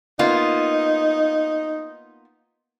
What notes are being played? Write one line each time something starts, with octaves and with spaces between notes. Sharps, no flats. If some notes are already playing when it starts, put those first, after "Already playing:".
A#3 B3 D#4 F4